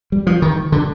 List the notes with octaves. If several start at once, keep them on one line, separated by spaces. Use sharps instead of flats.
G3
F3
D#3
D3